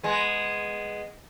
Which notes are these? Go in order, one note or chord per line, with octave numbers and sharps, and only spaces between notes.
G#3 B3